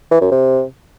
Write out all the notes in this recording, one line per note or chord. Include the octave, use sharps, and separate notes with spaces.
E3
F#2
C3